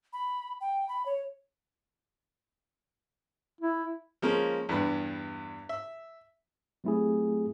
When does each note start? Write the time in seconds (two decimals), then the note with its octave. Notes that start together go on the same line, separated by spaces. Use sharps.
0.13 B5
0.61 G5
0.89 B5
1.06 C#5
3.61 E4
4.22 F3 G#3 A#3 C#4
4.69 E2 G2 B4 B5
5.69 E5
6.84 F#3 A3 C4 E4 G4 G#4